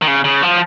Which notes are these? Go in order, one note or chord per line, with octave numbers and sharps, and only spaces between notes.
D#3
C#3
C#3
F3